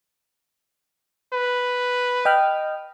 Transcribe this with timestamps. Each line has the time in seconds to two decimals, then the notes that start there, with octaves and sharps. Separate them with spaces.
1.33 B4
2.25 D#5 G5 F6